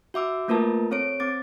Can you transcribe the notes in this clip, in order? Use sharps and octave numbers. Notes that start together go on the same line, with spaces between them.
F#4 E5 D6 E6
A3 A#3 F4 A#4 B4 A5
C4 A4 C#5 D7
C4 D6 A6